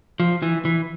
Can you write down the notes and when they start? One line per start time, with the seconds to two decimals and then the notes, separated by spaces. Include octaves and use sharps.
0.20 F3
0.42 E3
0.65 E3